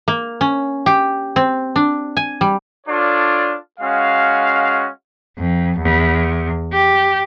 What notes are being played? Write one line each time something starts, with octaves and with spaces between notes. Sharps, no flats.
A#3
C#4
G4
C4
D4
G#5
G3
D4 F4 A4 C#5 D5
G#3 C#4 F#4 F5
F2
E2
G4